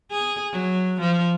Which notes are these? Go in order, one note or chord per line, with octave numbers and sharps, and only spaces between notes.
G#4
F#3
F3